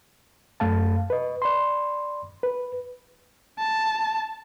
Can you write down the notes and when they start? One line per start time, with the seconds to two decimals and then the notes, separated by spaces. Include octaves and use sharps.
0.60 F#2 A3 F5 A5
1.10 B4 D#5
1.42 D5 B5 C6
2.43 B4
3.59 A5